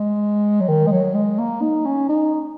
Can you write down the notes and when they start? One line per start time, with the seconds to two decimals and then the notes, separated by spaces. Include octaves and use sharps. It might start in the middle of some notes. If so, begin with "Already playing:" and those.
Already playing: G#3
0.61 F#3
0.68 D#3
0.87 G#3
0.91 F#3
1.15 G#3
1.39 A#3
1.62 D#4
1.85 C#4
2.09 D#4